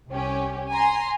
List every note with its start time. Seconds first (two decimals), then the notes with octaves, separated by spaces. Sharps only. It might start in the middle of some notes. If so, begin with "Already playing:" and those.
0.10 C2 C#4 G4
0.71 G#5 A#5 C6